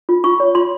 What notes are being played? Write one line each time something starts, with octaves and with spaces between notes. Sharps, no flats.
F4
F4 C#6
C#5
F4 C6